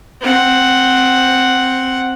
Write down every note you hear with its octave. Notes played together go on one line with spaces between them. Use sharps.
C4 F#5